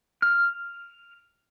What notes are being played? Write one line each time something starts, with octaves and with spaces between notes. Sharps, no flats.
F6